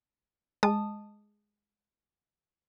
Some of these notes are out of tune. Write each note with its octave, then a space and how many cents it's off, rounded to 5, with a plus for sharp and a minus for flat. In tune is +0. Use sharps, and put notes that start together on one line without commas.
G#3 +0 A5 +0 D#6 -15